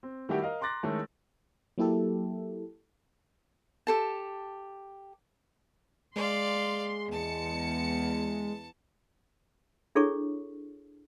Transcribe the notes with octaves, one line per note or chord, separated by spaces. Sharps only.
C4
D#3 G3 A3 E4 F#4 G4
A#4 D#5 F5
A#5 C6 D6 F#6 A6 A#6
D#3 G#3 A3 C#4 E4 A4
F#3 A#3 E4 G4 A4
G4 A4 A5
G#3 D5 F5 C6
E2 A5 C#7
D4 E4 G#4 A4 C#5 C#6